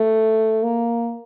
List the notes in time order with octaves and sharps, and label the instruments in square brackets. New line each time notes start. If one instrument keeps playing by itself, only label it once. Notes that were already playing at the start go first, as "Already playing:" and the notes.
Already playing: [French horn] A3
A#3